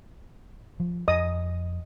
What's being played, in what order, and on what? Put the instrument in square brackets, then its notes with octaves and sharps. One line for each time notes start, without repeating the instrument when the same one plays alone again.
[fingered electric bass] F3
[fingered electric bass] F2 [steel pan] D#5 D#6